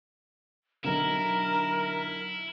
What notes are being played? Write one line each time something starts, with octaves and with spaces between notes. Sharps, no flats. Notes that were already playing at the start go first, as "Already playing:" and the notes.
B1 D3 E4 A#4